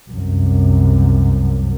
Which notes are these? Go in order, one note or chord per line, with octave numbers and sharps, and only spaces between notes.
C2 F#2